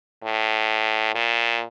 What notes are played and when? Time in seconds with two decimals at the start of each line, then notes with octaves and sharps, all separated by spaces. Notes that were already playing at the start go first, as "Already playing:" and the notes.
0.24 A2
1.15 A#2